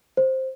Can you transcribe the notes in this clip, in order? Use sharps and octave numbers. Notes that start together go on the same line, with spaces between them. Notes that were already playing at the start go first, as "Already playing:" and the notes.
C5